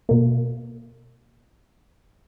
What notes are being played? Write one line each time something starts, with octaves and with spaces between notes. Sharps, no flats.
B2 A#3